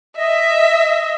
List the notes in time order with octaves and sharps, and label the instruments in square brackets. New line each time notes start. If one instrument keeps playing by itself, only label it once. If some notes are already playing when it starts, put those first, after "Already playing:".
[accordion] D#5 [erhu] E5